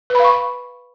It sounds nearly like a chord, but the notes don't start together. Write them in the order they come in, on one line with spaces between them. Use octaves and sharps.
B4 B5 F5 C#6